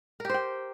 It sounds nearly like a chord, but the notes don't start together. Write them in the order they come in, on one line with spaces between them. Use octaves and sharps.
A#4 G4 C5 G5